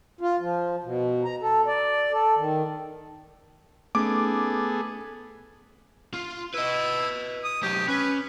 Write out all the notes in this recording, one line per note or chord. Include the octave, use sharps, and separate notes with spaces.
F4
F3
B2
A#5
A4
D5
A4
D#3
A3 B3 C#4 D#4 G#4 A4 D6
F4
E4 B4 D#5
D#6
D#3 F#3 G4
C#4 B4